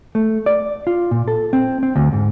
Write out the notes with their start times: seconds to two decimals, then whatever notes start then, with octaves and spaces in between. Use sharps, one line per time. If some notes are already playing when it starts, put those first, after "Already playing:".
0.15 A3
0.46 D5
0.87 F4
1.11 A#2
1.28 A4
1.53 C4
1.83 C4
1.96 D2
2.13 G#2